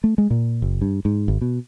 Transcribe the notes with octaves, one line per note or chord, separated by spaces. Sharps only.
A3
G#3
A#2
F#1
G2
G#2
G#1
B2